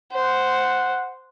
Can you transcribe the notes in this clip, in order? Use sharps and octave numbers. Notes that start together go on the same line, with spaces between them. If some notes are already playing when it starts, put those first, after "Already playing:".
C5 F#5